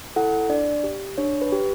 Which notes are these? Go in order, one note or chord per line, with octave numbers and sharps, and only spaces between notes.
E4 A4 F#5
D4 D5
G4
D4 C#5
B4
G4